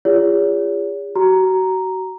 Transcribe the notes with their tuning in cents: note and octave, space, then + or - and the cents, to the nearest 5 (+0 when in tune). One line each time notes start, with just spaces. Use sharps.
F4 -25 G#4 -40 C#5 +40
F#4 +30 A#5 +0